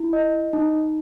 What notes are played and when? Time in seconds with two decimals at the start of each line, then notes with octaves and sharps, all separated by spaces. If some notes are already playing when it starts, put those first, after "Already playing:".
Already playing: E4
0.13 D#5
0.53 D#4